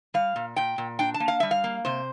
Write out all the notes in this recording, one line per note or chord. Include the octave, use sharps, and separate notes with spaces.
G3 F5
A#2
A#2 G5
A#2
D4 G5
A5
A#3
F5
G3 E5
F5
A#3
C3 C5